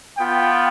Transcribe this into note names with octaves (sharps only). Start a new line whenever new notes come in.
B3 F4 G5